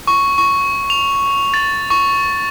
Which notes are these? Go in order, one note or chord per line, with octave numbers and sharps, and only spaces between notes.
C#6
C#6
F7
A6
C#6